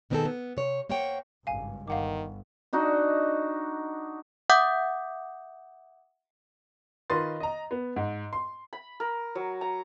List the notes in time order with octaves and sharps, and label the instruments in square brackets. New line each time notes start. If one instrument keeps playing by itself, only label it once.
[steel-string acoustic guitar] B2 D#3 B3 C4 G#4 A4
B3
C3 C#5
A#3 C5 C#5 F#5 G5
[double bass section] G#1 C#2 G2 [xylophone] F5 G#5
[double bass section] G1 [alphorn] D#3 [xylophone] F5 F#5 D6
[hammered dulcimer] D4 D#4 F#4 D#5
[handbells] E5 F#5 D6 D#6 G6
[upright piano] D#3 F4 B4 D#5 C6 A6
D#5 A#5
B3
G#2
C6
[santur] B5
A#4
F#3
A#5